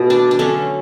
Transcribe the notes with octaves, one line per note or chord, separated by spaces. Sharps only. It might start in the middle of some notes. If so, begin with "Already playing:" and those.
Already playing: B2 A3 F#4
D4
D4
D3 F#3 A3 C#4